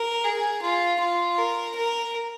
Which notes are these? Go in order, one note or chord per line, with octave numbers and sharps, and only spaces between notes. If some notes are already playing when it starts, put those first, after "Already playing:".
Already playing: A#4
G#4
F4
F4
A#4
A#4